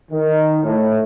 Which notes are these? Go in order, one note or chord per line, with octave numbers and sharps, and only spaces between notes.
D#3
A2